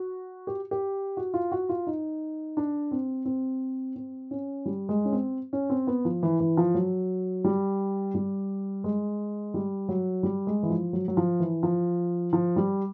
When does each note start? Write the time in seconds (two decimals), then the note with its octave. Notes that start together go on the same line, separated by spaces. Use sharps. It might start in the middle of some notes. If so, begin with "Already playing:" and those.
Already playing: F#4
0.47 G4
0.71 G4
1.17 F#4
1.34 F4
1.52 F#4
1.69 F4
1.87 D#4
2.57 D4
2.91 C4
3.25 C4
3.96 C4
4.31 C#4
4.66 G3
4.89 G#3
5.05 C#4
5.12 C4
5.53 C#4
5.70 C4
5.87 B3
6.05 F3
6.23 E3
6.40 E3
6.57 F3
6.75 F#3
7.44 G3
8.15 G3
8.84 G#3
9.54 G3
9.89 F#3
10.23 G3
10.47 G#3
10.63 E3
10.70 F3
10.93 F#3
11.08 F#3
11.17 F3
11.40 E3
11.63 F3
12.33 F3
12.56 G3